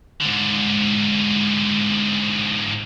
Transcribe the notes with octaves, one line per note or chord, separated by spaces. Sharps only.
G#2 D3